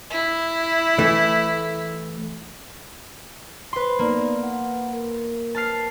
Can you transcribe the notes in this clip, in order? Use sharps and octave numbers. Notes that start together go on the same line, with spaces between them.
E4
E3 A3
B4 C6
A#3 B3 D#4 D5
F#5
A#4
A5 F6 C7